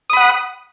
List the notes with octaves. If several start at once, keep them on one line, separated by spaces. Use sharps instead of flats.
F#5 B5 D#6